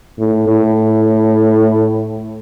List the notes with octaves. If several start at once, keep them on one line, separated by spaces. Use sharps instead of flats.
A2
A2